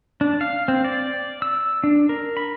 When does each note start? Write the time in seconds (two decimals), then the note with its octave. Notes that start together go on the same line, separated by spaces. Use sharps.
0.21 D4
0.41 F5
0.68 C4
0.85 D5
1.42 E6
1.84 D4
2.09 A#4
2.37 B5